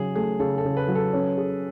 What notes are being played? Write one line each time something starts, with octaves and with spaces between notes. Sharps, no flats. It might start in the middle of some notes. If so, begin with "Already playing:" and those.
Already playing: C#3 F#3 G#4
A3 G#4
C#3 A4
A4
C#3
B4
F#3
A4
C#4
G#4